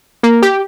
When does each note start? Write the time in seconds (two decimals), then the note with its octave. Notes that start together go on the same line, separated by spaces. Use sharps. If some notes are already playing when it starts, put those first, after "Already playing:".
0.23 A#3
0.42 G4